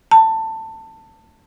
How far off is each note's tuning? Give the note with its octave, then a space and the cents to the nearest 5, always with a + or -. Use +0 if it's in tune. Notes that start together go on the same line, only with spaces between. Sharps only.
A5 +20